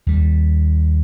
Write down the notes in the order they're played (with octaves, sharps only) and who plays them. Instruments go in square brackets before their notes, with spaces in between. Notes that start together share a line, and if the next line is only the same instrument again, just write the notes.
[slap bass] D#2 G3